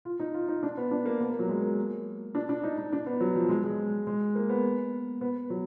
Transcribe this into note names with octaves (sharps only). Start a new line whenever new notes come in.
F4
D#4
F4
D#4
D4
B3
D4
A#3
B3
A#3
F#3
G#3
A#3
D4
D4
D#4
D#4
D4
B3
F#3
F3
G#3
G#3
G#3
A#3
B3
B3
F#3